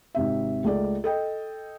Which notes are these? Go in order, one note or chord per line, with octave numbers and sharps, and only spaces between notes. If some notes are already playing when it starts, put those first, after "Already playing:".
G#1 C3 E5
C#2 A3 G#4 D5
A4 D#5 G5